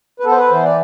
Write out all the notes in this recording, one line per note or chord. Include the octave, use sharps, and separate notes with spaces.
B4
B3 A4
C5
B4
E3 C5
D5